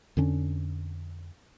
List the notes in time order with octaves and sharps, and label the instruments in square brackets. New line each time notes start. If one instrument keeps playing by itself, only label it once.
[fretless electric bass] F2 D3 C#4 D4